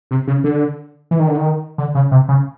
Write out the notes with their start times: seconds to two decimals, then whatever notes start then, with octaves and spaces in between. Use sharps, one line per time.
0.11 C3
0.27 C#3
0.44 D3
1.11 E3
1.19 D#3
1.28 D3
1.36 D#3
1.78 D3
1.95 C#3
2.11 C3
2.29 C#3